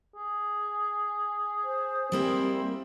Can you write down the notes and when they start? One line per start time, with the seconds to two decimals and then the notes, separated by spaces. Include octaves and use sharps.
0.16 G#4
1.64 C5
2.12 G3 A#3 C4 E4